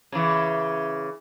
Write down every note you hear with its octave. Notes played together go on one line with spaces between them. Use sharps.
C#3 E3